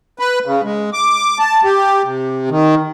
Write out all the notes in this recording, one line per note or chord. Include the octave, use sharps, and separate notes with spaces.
B4
C#3
G#3
D6
A5
G4
C3
D#3